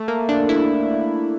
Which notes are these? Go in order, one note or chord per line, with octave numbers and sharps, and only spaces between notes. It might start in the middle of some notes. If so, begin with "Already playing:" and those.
Already playing: A3
A#3
D4
E4